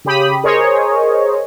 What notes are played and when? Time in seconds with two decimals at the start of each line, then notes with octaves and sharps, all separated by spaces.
0.05 C#3 G4 B5 D#6
0.44 G#4 A#4 C5 C#5 D#5